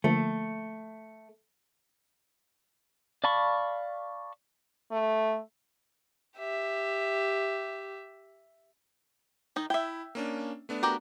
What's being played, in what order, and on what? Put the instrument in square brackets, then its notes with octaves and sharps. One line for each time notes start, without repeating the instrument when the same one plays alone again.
[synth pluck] D3 F3 A#3 [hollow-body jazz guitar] A3
[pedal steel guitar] D5 F5 A5 B5 C#6
[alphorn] A3
[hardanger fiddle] G4 E5
[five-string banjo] D#3 D#4
[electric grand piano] E4 [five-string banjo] E5 G5
[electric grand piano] A#3 C#4 D4
A3 B3 D4
[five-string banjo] F#4 G4 A#4